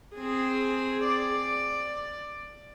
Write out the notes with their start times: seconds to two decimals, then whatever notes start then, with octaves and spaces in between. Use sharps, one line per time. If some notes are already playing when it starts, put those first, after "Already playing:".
0.15 C4 G#4
1.04 D5